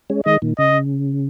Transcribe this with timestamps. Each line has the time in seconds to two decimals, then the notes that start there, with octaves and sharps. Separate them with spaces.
0.10 G#3 C#4
0.26 D#3 G#3 D#5
0.42 A#2 D#3
0.58 C#3 D#5